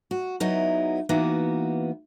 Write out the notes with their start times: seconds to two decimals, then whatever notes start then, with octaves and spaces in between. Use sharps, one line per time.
0.11 F#4
0.40 F#3 B3 D#4 E4
1.09 E3 A#3 B3 D#4 F#4